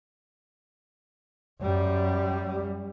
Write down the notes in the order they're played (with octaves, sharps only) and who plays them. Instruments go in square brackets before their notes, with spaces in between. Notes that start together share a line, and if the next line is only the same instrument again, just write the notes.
[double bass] F#2 G3